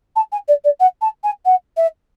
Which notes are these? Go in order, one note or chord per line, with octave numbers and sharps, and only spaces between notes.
A5
G#5
D5
D5
F#5
A5
G#5
F#5
E5